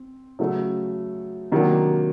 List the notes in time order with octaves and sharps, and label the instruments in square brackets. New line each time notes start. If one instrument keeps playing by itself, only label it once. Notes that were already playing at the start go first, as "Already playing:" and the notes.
Already playing: [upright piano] C4
C#3 F#3 A3
C3 D#3 F#3 A#3 D4